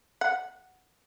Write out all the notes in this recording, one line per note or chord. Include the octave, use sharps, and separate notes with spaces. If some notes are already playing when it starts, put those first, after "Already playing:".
F#5